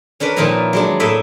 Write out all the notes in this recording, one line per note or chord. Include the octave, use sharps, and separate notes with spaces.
C#4 D4 A#4 B4
A#2 D#3 F3 E4 A#4 A#5
F#3 G#3 D4
A2 A#3 E4 D#5 E5